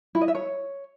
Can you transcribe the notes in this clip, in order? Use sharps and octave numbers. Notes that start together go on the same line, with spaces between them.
E4
D#5
E5
C#5